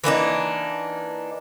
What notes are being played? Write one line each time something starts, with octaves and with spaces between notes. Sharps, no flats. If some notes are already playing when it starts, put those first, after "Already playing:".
E3 A#3 D4 D#4